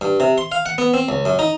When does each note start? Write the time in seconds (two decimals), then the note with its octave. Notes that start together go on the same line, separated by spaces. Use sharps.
0.01 G2
0.20 C3
0.38 C6
0.52 F5
0.66 F#5
0.78 B3
0.94 C4
1.09 C#2
1.25 F#2
1.39 D#4